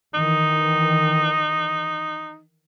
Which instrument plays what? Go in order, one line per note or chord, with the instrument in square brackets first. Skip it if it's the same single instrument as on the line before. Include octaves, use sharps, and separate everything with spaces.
[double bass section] D#3 E3 [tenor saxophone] D#4